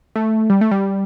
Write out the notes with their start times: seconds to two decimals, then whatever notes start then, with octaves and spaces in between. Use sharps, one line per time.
0.16 A3
0.50 G3
0.61 A3
0.71 G3